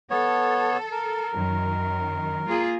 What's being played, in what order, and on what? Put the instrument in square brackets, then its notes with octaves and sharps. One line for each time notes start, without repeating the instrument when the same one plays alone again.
[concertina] B3 C#5 [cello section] A4
[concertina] A#4
[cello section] F#2 D#3
A#3 F4 G#4